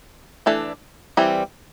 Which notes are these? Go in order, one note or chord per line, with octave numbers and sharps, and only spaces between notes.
E3 A3 D4 A4
E3 G3 C4